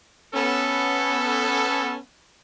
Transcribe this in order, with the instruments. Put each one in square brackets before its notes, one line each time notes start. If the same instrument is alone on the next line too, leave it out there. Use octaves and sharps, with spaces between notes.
[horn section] B3 C#4 A4